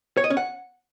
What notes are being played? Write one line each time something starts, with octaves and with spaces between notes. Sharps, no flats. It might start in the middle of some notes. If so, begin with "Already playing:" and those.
C#5
D#5
C#4
F#5